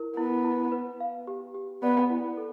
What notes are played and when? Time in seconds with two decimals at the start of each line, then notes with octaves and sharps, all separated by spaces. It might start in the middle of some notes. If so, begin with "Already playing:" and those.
Already playing: E4 A#4
0.17 B3 E4
0.45 E4
0.72 B4
1.00 F5
1.27 G4
1.55 G4
1.83 B3 D5
2.10 E4
2.37 A4